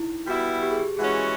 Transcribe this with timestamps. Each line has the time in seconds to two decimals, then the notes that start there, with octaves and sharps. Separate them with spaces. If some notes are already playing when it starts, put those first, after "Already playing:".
Already playing: D#4 E4
0.27 G3 B3 E4 F#4
0.62 G4
0.71 G#4
0.79 G4
0.97 E3 G#3 C#4 F#4 G#4